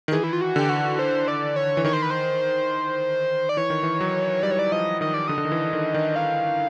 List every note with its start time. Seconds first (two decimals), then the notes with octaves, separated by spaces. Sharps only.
0.08 D#3
0.12 E3 G#4
0.23 E4
0.33 F4
0.41 F#4
0.56 D3 G4
0.69 F#4
0.99 C5
1.28 D5
1.56 C#5
1.77 E3
1.85 D#3 C#5
1.93 C5
2.03 B4
2.11 C5
3.49 D5
3.57 E3 C#5
3.70 D#3
3.83 E3
4.01 F#3
4.43 G3 D5
4.51 C#5
4.59 D5
4.72 F3 D#5
5.01 D#3 D#5
5.14 D5
5.28 D3 D#5
5.38 D3
5.45 D#3
5.52 E3
5.73 D#3
5.94 D#3
6.16 F5